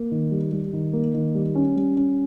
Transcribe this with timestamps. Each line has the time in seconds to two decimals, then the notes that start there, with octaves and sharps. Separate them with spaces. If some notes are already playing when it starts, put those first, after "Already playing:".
Already playing: A#3
0.11 D#3
0.31 G3
0.52 G3
0.73 D#3
0.93 A#3
1.14 D#3
1.35 G3
1.55 C#4
1.76 G3
1.97 C#4